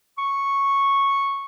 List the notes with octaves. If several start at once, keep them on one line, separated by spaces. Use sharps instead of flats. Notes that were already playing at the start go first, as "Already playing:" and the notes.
C#6